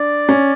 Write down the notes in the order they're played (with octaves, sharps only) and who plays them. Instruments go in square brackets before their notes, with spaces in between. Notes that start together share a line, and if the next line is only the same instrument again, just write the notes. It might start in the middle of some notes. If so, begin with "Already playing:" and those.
Already playing: [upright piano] D4 [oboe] D5
[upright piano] C#4